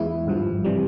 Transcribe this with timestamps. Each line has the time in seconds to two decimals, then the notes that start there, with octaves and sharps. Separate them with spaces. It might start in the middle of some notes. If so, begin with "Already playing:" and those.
Already playing: E2 E3 G#3 E4
0.26 G#1 G2 F3
0.65 C3 E3 G3